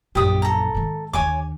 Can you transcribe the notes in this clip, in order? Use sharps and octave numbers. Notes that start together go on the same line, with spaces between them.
A#1 F#2 G4 D#6
A4 A#5
G#2 D#3
D#2 D3 C#5 G#5 D6